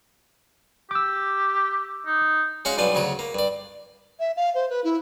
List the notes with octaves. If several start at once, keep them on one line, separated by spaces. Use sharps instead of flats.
G4 D6 E6
D#4
G#3 C#4 F#4 F5 C#6
B1 G2 D4 F4 G#5
D2 C#3 F#3 C#5
A#3
G2 D5
E5
F5
C5
B4
E4